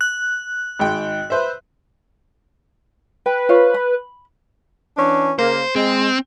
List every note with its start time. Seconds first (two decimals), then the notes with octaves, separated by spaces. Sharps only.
0.01 F#6
0.79 G#1 G#2 G5
1.30 B4 C5 E5
3.26 B4 G5
3.49 F4 C5 C#5
3.74 B5
4.98 E3 C#4 D4
5.39 C#3 A#3 C5
5.76 G#3 C4